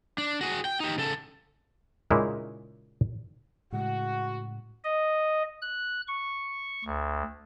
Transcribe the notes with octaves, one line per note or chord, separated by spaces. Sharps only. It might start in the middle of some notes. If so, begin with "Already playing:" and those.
D4
F#4 G#4
G5
D#4 G4
C#3 A4
A#2 C#3 G#3 A#3 D#4 E4
A2 C#3 G#3 F#4 F#5
D#5
F#6
C#6
D2